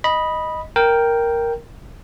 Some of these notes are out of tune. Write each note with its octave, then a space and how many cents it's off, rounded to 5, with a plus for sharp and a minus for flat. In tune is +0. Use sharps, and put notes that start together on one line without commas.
D#5 +0 B5 -10
A#4 +0 G5 +0